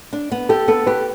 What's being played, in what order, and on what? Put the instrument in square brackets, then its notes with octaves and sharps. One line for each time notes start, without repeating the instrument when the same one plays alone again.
[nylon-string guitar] D4
B3
[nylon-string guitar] G4 [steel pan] A4
[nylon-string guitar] B3 [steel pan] A4
[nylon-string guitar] G4 [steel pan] B4